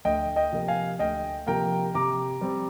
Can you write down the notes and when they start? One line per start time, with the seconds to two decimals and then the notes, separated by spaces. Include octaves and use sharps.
0.05 D2 D#5 G5
0.36 D#5 G5
0.52 C3 F3 A#3
0.68 F5 G#5
0.99 D2 D#5 G5
1.47 C3 F3 A#3 G5 A#5
1.94 C3 A#5 D6
2.41 G3 C4